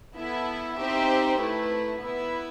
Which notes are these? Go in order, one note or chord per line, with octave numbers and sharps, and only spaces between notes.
B3 E4 A4 E5
C4 D#4 G4 C5 E5
A3 E4 B4
B3 E4 B4 E5